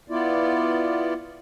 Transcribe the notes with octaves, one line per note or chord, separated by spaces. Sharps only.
B3 E4 F4 D5